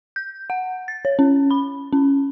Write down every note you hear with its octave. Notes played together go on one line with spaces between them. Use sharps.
G6
F#5
A6
C#5
C#4
B5
C#4